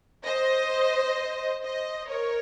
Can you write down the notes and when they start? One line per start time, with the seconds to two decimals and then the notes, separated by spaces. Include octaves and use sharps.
0.24 C5 D#5
1.62 C5 D#5
2.09 A#4 C#5